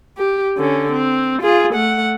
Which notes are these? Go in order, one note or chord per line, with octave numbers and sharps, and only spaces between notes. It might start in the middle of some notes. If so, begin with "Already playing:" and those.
G4
D3 C#4
C4
F4 G#4
A3 F#5